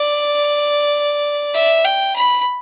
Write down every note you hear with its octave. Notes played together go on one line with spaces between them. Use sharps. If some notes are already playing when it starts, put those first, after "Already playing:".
Already playing: D5
E5
G5
B5